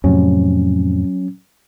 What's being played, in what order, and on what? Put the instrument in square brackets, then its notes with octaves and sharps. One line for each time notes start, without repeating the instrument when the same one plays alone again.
[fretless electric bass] F2 A2 C3 [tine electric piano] F#3 C#4